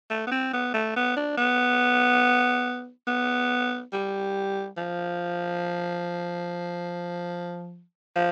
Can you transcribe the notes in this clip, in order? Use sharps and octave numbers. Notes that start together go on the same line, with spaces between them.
A3
B3
C4
B3
A3
B3
D4
B3
B3
G3
F3
F3